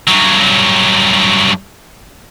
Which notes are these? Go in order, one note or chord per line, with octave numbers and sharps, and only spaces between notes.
G2 F#3